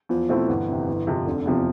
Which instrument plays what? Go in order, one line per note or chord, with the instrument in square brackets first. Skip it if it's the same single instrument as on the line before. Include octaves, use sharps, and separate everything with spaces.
[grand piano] E2 [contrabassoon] F3
[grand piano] B2 A3 C4 E4
[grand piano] G1 [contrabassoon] E3
[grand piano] F2 C3
G1
F2 C3 F3
[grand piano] F1 [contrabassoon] D3
[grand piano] E2 C3 F3